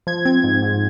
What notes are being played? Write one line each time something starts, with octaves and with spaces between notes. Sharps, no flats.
F3 G#6
C4 G#6
G#2
G#2